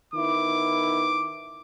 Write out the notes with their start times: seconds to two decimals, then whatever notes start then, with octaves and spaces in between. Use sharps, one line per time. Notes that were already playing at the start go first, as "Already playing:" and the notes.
0.14 D#3 B3 E4 D6